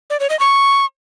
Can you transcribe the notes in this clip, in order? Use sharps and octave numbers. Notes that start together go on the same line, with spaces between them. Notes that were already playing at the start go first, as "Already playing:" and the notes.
D5
C#5
D#5
C#6